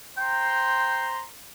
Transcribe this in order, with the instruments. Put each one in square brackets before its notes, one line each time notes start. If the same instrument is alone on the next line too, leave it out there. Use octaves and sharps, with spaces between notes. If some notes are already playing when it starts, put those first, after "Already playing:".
[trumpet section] C5 A#5 C6 [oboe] G5